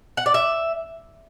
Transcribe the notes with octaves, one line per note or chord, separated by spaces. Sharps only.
F#5
D5
E5